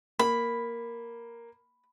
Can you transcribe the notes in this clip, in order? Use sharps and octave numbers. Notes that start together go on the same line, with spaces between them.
A#3 B5